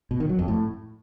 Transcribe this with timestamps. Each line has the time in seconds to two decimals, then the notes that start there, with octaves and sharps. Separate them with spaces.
0.11 B2
0.20 D#3
0.29 F#3
0.39 F2
0.48 A2